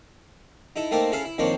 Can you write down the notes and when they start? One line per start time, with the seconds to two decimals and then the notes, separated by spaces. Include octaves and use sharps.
0.76 D#4 E4 A4
0.91 A3 A#3 C4 D#4 A4
1.12 C#4 E4 G#4 A4 F5
1.24 E4
1.38 F2 D#3 A#3 D4 C5 C#5